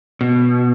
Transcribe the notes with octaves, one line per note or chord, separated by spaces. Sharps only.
B2